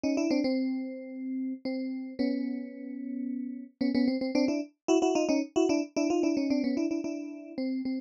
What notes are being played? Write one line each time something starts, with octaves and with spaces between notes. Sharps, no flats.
C#4 D#4
D4 E4
C4 D4
C4
C4
B3 C#4
B3 C#4
B3 C#4
C4
C4
C4 D4
D4 E4
E4 F#4
E4 F#4
D#4 F4
C#4 D#4
E4 F#4
D4 E4
D4 E4
D#4 F4
D4 E4
C#4 D#4
C4 D4
B3 C#4
D4 E4
D4 E4
D4 E4
C4
C4